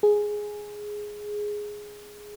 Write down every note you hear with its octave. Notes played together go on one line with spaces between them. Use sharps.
G#4